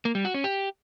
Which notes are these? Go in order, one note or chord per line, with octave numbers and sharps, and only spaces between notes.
A#3
G3
F#4
C#4
G4